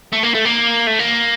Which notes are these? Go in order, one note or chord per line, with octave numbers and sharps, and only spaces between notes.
A3
A#3
A3
A#3
A3
A#3